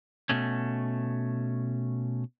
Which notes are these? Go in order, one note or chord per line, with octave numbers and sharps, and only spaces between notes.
B2 A3 C#4